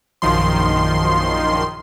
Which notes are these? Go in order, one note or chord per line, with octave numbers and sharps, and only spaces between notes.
A#1 F#2 D#3 F3 C6